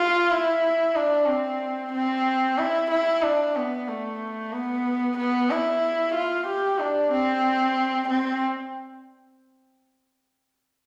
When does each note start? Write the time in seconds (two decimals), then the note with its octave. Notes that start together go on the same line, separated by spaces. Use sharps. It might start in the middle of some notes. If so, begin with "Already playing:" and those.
Already playing: F4
0.31 E4
0.95 D4
1.28 C4
1.93 C4
2.58 E4
2.91 E4
3.22 D4
3.56 B3
3.88 A3
4.52 B3
5.17 B3
5.50 E4
6.15 F4
6.47 G4
6.79 D4
7.12 C4
8.09 C4